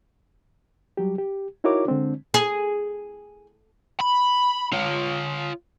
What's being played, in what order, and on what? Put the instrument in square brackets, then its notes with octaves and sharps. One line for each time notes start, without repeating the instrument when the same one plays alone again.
[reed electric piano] F#3 G3 G4
G4
D#4 E4 F#4 A#4 C#5 D6
D3 G#3 C4 D4
[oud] G#4
[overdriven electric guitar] B5
F4 C#5